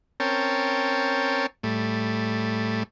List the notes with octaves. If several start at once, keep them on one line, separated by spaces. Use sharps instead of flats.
C4 C#4 A#4 C#5 G5 A5
A2 G3 A3